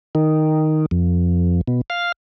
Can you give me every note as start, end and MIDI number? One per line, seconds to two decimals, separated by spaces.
0.15 0.86 51
0.91 1.61 41
1.68 1.81 47
1.90 2.12 77